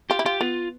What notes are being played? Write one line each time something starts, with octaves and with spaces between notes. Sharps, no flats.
F4 G4
E4
F4 G4
B3 F4